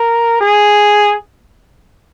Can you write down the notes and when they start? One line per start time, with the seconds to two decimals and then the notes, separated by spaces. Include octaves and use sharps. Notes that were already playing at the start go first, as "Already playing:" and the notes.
Already playing: A#4
0.41 G#4